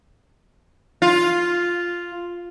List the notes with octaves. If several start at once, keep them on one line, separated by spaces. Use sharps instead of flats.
F4